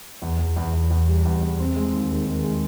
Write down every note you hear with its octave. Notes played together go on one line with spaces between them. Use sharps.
E2
E2
E2
E2
E2
G3
E2
E2
C4
G#3
D#2
D#3
D#3
G#3